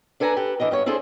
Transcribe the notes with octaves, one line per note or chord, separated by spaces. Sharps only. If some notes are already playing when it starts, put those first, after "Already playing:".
D4 A4 B4 G#5 A#5
G4 A4 B4
D3 E3 D4 D#5
G2 B3 C#5
C4 D4 E4 G#4 A4 C5